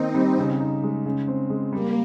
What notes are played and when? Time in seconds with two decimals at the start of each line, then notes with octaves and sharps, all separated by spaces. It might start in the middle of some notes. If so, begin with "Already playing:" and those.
Already playing: D#3 A#3 C4 D#4
0.14 G3
0.38 C#3
0.60 D#4
0.83 G#3
1.06 C#3
1.28 C4
1.50 G#3
1.73 G3 A#3